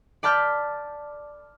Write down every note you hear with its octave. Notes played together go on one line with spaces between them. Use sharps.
D5 A5 B5 F6 G6 A6